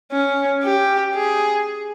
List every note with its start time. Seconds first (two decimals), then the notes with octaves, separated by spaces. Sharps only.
0.12 C#4
0.63 G4
1.15 G#4